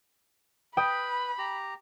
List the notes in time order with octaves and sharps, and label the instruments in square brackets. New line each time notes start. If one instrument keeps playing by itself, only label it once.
[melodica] B4 [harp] G5 D#6 [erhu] B5
[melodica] G4 A#5